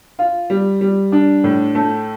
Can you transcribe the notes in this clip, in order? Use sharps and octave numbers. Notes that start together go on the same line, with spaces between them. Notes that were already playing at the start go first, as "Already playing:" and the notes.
F4
G3
G3
D4
A2
A3